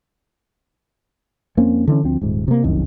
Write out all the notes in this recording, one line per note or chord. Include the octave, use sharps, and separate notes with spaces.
F2 A#3 C4 C#4
D3 E3 C4 C#4
D2 F3 C4
D#1 G#2
C3 A#3
F1 C2 F#2 D#3